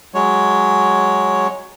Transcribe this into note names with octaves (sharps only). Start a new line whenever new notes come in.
F#3 G#3 C#5